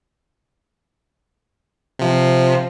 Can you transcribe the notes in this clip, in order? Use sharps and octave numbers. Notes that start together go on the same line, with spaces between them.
C3 F3